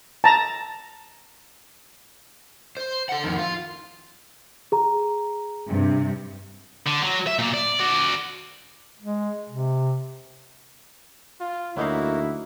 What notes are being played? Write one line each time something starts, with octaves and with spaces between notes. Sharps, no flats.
A5 A#5
C5
A4 F#5
F2 D#3
F4
G#4 A#5
G2 C3
D3
F#3
E5
A#2 A#3
D5
F#4 D5
G#3
C3
F4
D2 F#3 A#3 D#4 E4 F#4 F5